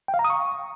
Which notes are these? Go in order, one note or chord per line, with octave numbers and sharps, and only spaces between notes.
G5
F5
A#5
D#6
C#6